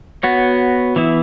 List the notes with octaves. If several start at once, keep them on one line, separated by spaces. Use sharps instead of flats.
B3 F#4 C#5
E3 B3 E4